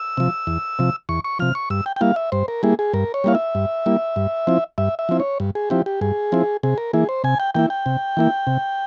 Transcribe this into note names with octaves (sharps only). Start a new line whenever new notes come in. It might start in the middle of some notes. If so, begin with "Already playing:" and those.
Already playing: E6
C3 F3
E2
C3 F3
E2 C#6
C#6
C3 F3 F6
C#6
G2 E6
G5
G5
G3 A#3 E4 F5
E5
G2 C5
A#4
G3 A#3 E4 G#4
G#4
G2 A#4
C#5
G3 A#3 E4 F5
E5
G2
G3 A#3 E4
G2
F3 C4 E4
G2 E5
E5
F3 C4 E4
C#5
G2
G#4
F3 C4 E4 G4
G4
G2 G#4
F3 C4 E4
C3 G#4
A#4
E3 A#3 E4 G#4
C5
C3 G#5
G5
E3 A#3 E4 G5
G5
C3
E3 A#3 E4
C3